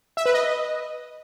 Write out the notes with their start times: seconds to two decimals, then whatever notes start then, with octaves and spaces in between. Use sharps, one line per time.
0.17 E5
0.26 B4
0.34 D#5